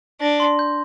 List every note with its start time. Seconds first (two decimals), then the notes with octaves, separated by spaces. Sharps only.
0.21 D4 A#6
0.40 C6
0.59 G6